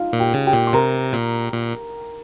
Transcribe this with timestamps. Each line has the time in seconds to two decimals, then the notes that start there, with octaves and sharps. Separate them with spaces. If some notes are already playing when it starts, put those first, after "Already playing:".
Already playing: D#4 F4 F5
0.13 A#2
0.20 G4 G5
0.33 C#3
0.46 G4 G5
0.53 A#2
0.67 C6
0.73 C3 A#4 A#5
1.13 A#2
1.53 A#2